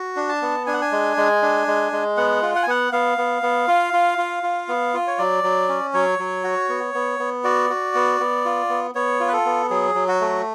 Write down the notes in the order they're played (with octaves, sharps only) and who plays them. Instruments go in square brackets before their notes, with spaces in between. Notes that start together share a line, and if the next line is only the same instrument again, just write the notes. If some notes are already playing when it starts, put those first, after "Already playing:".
Already playing: [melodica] F#4
D4
A5
B3
D4 G#5
F#5
G#5
G#3
G#3
D4
G#3
G#3
B3 F#5
F4
F#5
G#5
B3 F#5
B3 F5
B3
B3
F4
F4
F4
F4
B3
F4
C#5
F#3 D5
F#3
C#4
F#3 C#5
F#3
F#4
B3
B3
B3
F#4 D5
F#4
B3
B3
F4
B3
B3 C#5
F4
B4
A4
B3
F#3 G#4
F#3
F#4
A3